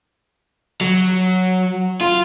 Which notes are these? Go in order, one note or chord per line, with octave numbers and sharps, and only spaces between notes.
F#3
F4